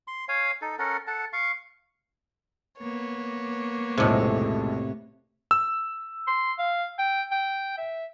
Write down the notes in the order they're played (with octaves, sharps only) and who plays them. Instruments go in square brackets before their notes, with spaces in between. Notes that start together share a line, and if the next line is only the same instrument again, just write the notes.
[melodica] C6
C#5 F5 G#5
D#4 A4
C#4 A4 A#4 F#5
A4 F#5 A5
F5 C#6
[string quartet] A#3 B3 C#5
[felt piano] B1 F2 G#3 [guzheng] A2 C3
[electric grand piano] E6
[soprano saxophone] C6
F5
G5
G5
E5